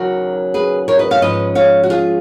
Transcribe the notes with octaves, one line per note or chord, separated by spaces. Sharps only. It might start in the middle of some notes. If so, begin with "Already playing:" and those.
Already playing: D#2 C#3 F#3 F#4 A#4
G#4 B4
A#4 C#5
B4 D#5
C#5 F5
G#2 F3 G#3 C#4 B4 D#5
C#5 F5
F#4
F4 G#4